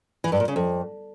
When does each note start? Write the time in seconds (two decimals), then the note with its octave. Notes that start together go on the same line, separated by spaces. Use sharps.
0.24 E3
0.32 G2
0.40 A#2
0.48 C#3
0.56 F2